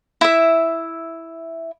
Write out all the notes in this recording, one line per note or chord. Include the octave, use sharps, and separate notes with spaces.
E4 E5